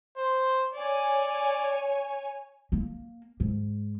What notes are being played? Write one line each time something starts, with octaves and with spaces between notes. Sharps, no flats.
C5
C#5 D5 G#5
A#3
G#2